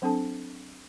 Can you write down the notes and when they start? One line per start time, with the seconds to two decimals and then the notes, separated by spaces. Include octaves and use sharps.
0.02 F#3 C4 D4 A4 A5